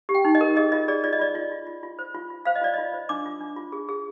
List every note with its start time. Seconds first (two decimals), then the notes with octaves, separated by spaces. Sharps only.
0.09 G4
0.14 G5
0.25 D#4
0.35 D#5
0.41 A#4
0.56 G#4 D#5
0.72 F4 D#5
0.88 G#4 D5
1.04 F4 D5
1.13 D#5
1.19 F4 D5
1.35 F4
1.52 F4
1.67 F4
1.83 F4
1.99 C5
2.15 F4
2.30 F4
2.45 C5 F5
2.55 D#5
2.61 F4 D5
2.74 F4 D#5
2.94 C5
3.09 D4 D6
3.25 F4
3.41 D4
3.56 F4
3.72 G#4
3.89 G#4